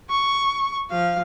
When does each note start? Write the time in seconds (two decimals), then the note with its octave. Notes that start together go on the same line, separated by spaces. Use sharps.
0.10 C#6
0.90 F3 F5